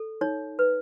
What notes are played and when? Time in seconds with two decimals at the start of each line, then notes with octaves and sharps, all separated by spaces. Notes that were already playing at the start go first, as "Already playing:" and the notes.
Already playing: A4
0.21 D#4 C#5
0.59 B4